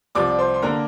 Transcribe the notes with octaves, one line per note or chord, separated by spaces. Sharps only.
C2 C3 F3 D5 D6
C5 C6
C6
D3 A#3 A#4 A#5